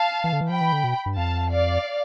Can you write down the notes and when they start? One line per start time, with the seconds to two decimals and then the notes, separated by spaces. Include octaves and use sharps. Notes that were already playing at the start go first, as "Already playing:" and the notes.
Already playing: F5 A5
0.24 E3
0.33 D3
0.41 E3
0.49 F3 G5 B5
0.61 E3
0.72 D3
0.84 B2
1.06 G2
1.17 F2 F5 A5
1.51 D5 F5